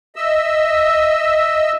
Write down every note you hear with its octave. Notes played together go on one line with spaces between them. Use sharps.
D#5 E5 E6